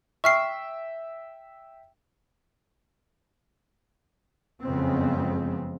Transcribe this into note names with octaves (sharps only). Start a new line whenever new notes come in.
E5 G5 C#6 F6 C7
F#1 F2 C#3 G#3 B3 C4